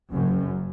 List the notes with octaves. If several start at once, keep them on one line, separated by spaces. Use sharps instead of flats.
F#1 F#2